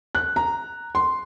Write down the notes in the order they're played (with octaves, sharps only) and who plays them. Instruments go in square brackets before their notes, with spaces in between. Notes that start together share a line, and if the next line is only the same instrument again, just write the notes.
[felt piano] F#6
A#5
C6